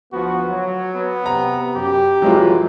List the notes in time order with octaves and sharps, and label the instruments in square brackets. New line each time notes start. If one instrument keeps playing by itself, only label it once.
[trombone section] D2 F3 B3 [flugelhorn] F#4
[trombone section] F#3
[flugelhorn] B3
[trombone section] C3 [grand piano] A#5
[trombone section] F#2 [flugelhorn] G4
[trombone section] F2 C3 E3 [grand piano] F#3 G#3 F4